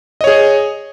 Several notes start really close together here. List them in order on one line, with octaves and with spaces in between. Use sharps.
D#5 C#5 G#4